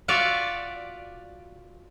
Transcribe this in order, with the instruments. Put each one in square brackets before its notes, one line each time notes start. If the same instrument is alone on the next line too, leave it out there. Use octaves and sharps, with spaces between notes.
[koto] F4 F#4 D5 E5 F5